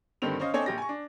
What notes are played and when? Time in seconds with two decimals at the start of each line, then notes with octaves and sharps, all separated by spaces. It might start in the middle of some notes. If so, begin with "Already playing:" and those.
0.22 G2 D3 D#3 C4 F7
0.40 C#4 C5 D#5 F5
0.54 C4 D4 A4 C#5 D#5 G#5
0.66 A#1 G4 A#6
0.78 G#5 C#6
0.89 D4